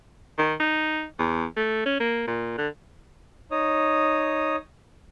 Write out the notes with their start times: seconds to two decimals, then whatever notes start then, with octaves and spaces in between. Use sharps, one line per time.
0.38 D#3
0.60 D#4
1.19 E2
1.57 A3
1.86 C#4
2.00 A#3
2.27 A#2
2.58 D3
3.51 D#4 C#5 D#6